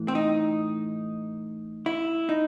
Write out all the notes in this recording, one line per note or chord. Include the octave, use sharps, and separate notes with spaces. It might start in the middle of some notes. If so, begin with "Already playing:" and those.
Already playing: A2 E3
C4
D#4
E4
D#4